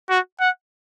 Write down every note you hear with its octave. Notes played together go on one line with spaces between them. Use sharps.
F#4
F#5